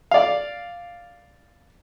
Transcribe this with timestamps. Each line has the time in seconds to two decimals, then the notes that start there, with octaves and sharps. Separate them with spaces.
0.11 D5 F5